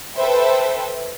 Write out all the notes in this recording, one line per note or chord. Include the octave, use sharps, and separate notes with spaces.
A4 B4 C5 E5 G5